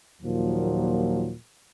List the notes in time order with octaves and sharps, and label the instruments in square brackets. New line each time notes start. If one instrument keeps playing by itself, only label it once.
[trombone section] D#2 A#2 F3 F#3